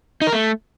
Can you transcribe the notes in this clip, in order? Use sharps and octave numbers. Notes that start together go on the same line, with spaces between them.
D#4
A#4
A3